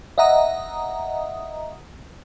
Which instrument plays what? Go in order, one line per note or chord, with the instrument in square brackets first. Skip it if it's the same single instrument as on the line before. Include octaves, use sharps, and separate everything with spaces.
[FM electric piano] D#5 E5 F#5 A#5 D#6